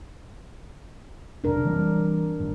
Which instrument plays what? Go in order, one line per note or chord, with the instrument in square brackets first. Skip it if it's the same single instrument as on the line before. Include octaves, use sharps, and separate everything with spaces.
[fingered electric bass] F1 B1 [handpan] D4 A#4
[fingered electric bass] E3 G3 C4
G#1 G2 A#2